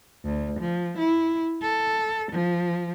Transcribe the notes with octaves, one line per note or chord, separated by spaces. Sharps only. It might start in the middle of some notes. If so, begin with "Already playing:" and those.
D2
F3
E4
A4
F3